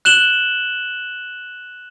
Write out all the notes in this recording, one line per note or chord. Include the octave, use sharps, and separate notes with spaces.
F#6 E7 F#7 G7